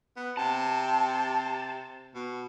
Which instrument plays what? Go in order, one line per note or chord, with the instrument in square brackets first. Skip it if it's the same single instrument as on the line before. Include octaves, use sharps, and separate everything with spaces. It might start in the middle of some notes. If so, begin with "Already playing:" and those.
[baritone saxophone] B3
[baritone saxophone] C3 [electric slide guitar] A5
[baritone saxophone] B2